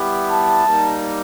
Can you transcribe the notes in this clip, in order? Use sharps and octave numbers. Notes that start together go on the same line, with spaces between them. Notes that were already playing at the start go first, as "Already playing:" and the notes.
Already playing: G3 B3 E4 G4
A5
G3 A#3 D#4